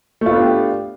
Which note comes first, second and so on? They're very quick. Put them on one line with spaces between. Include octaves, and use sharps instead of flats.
A3 F4 B3 D4 G4